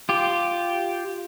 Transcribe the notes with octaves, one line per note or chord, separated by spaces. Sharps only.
F4 G4